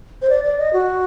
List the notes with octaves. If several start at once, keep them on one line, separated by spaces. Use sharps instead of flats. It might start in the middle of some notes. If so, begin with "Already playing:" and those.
C5
D5
D5
D#5
F#4